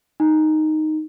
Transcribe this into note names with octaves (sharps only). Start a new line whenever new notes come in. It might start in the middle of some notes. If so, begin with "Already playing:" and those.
D#4